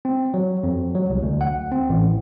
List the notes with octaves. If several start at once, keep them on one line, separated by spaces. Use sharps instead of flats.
C4
F#3
F2
F#3
C2
D2
F#5
C4
A1